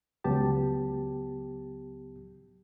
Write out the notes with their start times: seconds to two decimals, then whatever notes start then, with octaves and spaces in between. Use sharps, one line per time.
0.24 C#2 F#3 B3 G4 A5